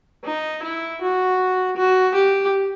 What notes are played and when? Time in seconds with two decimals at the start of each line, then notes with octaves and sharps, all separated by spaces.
0.25 D#4
0.63 E4
1.01 F#4
1.77 F#4
2.15 G4